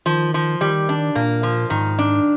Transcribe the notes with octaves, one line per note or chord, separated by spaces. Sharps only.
D#3 F3
F3
D#3 G3
D4
A#2 A#3
F3
G#2 D#3
D4